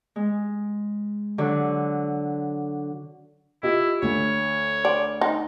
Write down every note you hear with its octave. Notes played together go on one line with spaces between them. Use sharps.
G#3
D3 F#3
E4 F4 G4 D#5
D2 C#5
D5
D#4